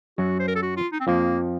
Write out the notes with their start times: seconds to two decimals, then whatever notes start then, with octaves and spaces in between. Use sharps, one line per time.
0.18 F#2 F#3 F#4
0.39 C5
0.48 A#4
0.56 A4
0.63 F#4
0.77 F4
0.92 D#4
1.00 C4
1.07 F2 F3 A#3